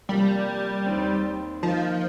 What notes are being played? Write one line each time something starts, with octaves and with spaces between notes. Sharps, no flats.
C3 F3 G3 A#3 G4
D#2 D#3 C4
D#3 F3 A#3 D#4